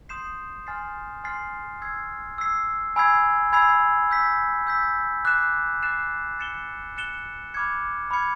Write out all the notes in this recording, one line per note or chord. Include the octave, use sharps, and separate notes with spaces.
C6 D#6 G6 C7 E7
G#5 C6 F6 A6 C7
G#5 C6 F6 A6 C7
E6 G#6 C7
E6 G#6 C7
G#5 B5 E6 G#6 C7
G#5 B5 E6 G#6 C7
E6 G6 B6
E6 G6 B6
D6 F#6 A6 C7 E7
D6 F#6 A6 C7 E7
F#6 A6 C#7 E7 G7
F#6 A6 C#7 E7 G7
B5 D6 F6 G#6 C#7
B5 D6 F6 G#6 C#7